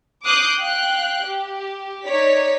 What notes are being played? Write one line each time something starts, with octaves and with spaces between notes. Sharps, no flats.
D6 D#6 F#6 G6 C7 D7
F5 G5 F#6
G4
D#4 C#5 D5 B6